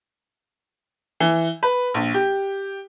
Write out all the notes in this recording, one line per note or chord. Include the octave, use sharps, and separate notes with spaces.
E3
B4
A#1
G4